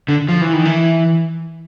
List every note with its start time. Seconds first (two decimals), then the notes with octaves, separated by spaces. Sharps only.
0.08 D3
0.29 F3
0.41 E3
0.53 D#3
0.65 E3